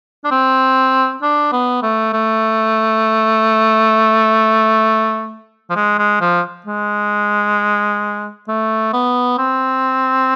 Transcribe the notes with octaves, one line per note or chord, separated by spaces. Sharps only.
D4
C4
D4
B3
A3
A3
F3
G#3
G#3
F3
G#3
A3
B3
C4